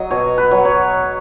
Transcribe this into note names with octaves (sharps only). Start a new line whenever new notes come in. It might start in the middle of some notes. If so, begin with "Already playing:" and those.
Already playing: F#3 D#5
B2 C#5
B4
F#3
C#5